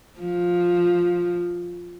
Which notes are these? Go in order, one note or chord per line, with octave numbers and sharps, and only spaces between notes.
F3